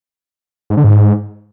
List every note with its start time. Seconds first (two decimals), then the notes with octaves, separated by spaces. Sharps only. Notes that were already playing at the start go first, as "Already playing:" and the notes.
0.70 G#2
0.77 D3
0.84 G#2